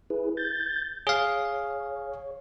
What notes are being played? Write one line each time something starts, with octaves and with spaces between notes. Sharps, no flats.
E4 G#4 B4
G6 A6
G#4 C#5 F5